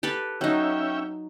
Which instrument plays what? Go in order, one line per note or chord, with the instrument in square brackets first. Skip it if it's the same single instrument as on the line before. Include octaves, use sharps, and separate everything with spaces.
[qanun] G4 A4 B4
[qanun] F#3 D#4 [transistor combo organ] C#4 E5 G5